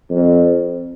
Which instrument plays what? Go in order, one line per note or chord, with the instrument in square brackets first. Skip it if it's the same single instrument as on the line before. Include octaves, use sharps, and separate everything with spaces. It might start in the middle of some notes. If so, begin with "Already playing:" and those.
[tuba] F2